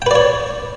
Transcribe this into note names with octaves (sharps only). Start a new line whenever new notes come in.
B4 C#5 D5 G5